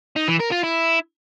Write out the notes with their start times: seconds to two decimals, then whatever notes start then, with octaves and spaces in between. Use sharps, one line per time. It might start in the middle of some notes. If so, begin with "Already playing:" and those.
0.16 D#4
0.28 E3
0.39 A#4
0.51 F4
0.63 E4